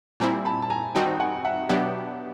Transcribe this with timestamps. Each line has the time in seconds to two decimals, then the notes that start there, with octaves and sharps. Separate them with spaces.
0.20 A#2 G3 C4 E4 G#5 A#5
0.45 A5 B5
0.62 A5
0.70 G#5 A#5
0.95 D#3 G3 C4 D#4 F#4 G5 A5
1.20 F#5 G#5
1.45 E5 F#5
1.69 B2 F#3 B3 D4 G4 E5 F#5